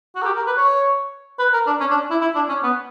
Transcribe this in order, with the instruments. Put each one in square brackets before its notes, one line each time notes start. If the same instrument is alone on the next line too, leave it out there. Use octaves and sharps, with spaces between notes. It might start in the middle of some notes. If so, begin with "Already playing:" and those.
[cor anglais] F#4
A#4
G4
A#4
B4
C#5
B4
A#4
D4
C#4
D4
E4
E4
D4
C#4
B3